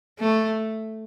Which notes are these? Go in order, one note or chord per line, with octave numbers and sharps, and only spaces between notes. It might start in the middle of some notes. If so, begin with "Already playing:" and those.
A3